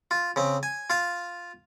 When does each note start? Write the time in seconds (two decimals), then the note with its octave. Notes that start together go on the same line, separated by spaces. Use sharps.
0.11 F4
0.36 C#3 C4
0.63 G#5
0.90 F4 F5